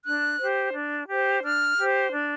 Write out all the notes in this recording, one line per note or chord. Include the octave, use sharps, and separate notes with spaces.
D4 F#6
G4 C5
D4
G4 C5
D4 F6
G4 C5
D4